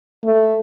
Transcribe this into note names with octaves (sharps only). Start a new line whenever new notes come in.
A3